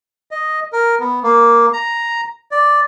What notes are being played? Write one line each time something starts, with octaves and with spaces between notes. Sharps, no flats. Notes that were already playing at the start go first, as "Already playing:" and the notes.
D#5
A#4
B3
A#3
A#5
D5